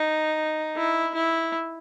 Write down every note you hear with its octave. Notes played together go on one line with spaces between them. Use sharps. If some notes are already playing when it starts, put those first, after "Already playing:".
Already playing: D#4
E4
E4